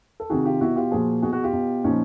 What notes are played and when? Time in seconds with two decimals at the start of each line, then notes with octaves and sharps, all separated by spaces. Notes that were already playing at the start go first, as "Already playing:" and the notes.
0.20 A4
0.30 C3 D#3 F#4 G#4
0.45 F4 G4
0.61 B2 E4 F#4
0.76 F4 G4
0.91 A#2 F3 F#4 G#4
1.22 B2 F#4 G#4
1.32 F#4 G#4
1.43 F4 G4
1.53 B2
1.84 A#2 F3 C#4 D#4